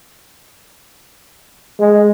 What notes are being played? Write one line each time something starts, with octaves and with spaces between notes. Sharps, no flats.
G#3